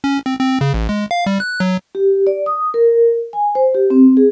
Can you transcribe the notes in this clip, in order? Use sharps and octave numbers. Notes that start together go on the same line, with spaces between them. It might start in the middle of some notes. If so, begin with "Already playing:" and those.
C#4
C4
C4
C#3
A1
G#3
F5
G3
F#6
F#3
G4
D5
D#6
A#4
G#5
C5
G4
C4
G#4